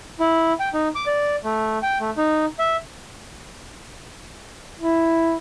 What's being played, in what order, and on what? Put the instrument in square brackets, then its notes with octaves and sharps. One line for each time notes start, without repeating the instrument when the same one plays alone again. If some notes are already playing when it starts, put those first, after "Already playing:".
[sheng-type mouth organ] E4
G5
D#4
D6
D5
A3
G5
A3
D#4
E5
[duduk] E4